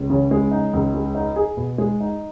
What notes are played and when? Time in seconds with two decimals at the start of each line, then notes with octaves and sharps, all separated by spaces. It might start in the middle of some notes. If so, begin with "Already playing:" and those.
Already playing: C#2
0.10 C#3
0.31 G#3
0.51 D#4
0.73 C#2
0.94 G#3
1.15 D#4
1.36 G#4
1.57 B2
1.78 G#3
2.00 D#4